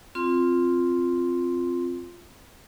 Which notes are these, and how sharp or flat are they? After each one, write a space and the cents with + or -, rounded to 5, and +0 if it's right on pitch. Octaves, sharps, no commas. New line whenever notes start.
C4 +0 F4 +0 C6 +0